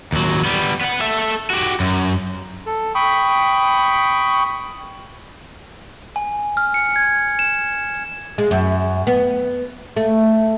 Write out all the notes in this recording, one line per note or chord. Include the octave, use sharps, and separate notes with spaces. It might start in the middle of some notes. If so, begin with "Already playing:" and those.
D#2 F#3
G3 B3
B3 F#5
A4 E5
F#4 G4
F#2
A4
G5 B5 C#6 D#6
G#5
F6
C#7
G#6
E7
G#3
F#2
B3
A3